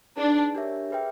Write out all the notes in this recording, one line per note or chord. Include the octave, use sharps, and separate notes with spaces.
D4 D#4 G#4 B4
D4 G4 A#4 C#5 E5
G#4 B4 E5 G5